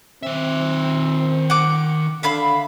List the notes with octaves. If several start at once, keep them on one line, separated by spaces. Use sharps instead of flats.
D#3 C4 E5
F#5 D6
D3 E5 F5 B5